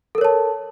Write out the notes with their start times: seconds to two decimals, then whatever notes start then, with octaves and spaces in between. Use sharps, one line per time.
0.15 A4
0.18 A#4
0.21 C#5
0.25 A5